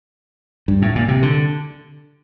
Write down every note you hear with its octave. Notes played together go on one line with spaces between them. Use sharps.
G2
A2
A#2
C3
D3